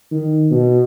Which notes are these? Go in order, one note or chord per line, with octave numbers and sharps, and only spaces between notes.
D#3
B2